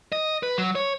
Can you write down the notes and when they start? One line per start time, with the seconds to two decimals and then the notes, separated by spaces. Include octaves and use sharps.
0.12 D#5
0.43 B4
0.58 F#3
0.75 C#5